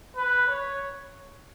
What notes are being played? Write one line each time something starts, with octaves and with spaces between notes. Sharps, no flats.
B4
C#5